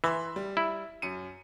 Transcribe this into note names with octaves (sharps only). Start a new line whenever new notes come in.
E3 E5 B5 C6
G3
E4
F#2 C#7 D#7